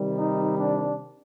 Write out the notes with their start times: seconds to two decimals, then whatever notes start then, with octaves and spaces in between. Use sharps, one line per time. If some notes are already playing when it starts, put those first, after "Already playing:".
Already playing: C3 D#3 G3
0.18 D#4
0.58 D4